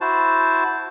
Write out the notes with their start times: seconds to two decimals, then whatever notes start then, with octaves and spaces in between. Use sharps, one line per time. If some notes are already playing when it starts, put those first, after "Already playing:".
0.01 E4 F#4 C5 A5